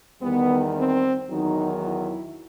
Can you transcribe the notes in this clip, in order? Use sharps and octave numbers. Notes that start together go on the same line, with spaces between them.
E2 D#3 G3 B3
C4
E2 D#3 F#3 D#4
E4